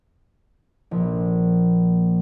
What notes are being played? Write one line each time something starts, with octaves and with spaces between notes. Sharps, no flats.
A#1